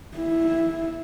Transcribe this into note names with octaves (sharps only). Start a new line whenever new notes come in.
E4